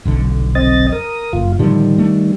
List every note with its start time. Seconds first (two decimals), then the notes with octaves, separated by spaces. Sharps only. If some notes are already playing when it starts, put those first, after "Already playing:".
0.05 F1 B1 D3
0.55 C4 D#5 A6
0.92 A#4 D#6
1.33 F#1 F4
1.59 A2 D3 D#3 F3 G3
1.98 A3 D4